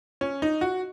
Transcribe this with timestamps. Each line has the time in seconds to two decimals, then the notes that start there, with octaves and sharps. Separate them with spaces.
0.21 C#4
0.42 D#4
0.61 F#4